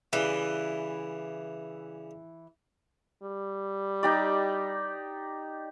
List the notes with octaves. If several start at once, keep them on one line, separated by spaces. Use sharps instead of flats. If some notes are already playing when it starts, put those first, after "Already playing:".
C#3 E3 G3
G3
D#4 G4 D5